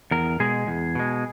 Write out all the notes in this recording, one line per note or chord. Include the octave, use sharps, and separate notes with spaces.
E2 A#4
B2 G#3 G#4
E2
B2 G#3